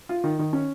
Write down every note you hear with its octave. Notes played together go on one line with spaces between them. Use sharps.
F4
D#3
D#3
C#4